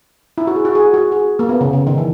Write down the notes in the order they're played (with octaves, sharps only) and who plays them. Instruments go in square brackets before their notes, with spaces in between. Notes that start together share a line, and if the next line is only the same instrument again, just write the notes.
[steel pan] E4
F#4
G#4
F#4
G#4
F#4
G#4
A#3
B3
C#3
C#3
D#3
E3